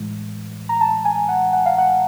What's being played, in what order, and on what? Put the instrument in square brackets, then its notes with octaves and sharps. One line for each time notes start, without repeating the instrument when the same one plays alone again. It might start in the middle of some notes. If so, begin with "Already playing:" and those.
Already playing: [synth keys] A2 E3 G#3
A#5
A5
G#5
F#5
F#5
F5
F#5